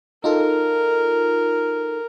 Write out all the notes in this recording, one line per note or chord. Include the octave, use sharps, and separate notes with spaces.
D#4 F4 A4 A#4